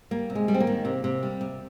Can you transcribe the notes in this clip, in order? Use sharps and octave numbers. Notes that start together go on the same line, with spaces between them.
G3 A#3
C3
G#3
G3
C4
A#3
D#3
C3
C3
G3
C3